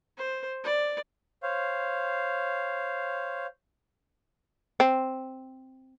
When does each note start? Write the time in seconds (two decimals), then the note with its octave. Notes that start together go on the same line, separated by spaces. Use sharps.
0.17 C5
0.64 D5
1.43 C5 C#5 F5
4.80 C4